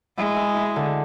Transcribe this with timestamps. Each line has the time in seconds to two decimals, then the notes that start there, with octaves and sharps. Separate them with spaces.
0.17 G#3 E4
0.36 E4
0.56 E4
0.76 D3